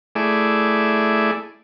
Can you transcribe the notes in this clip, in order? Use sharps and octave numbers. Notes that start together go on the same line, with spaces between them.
A3 E4 G#4 D5